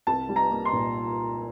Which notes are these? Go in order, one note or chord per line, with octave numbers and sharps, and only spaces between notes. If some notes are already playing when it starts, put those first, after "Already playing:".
C2 A5
G3
A#5
A#3
C6
A#2